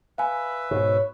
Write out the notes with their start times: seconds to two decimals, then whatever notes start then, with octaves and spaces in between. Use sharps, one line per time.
0.18 B4 E5 F5 G#5
0.71 G#2 B2 C#5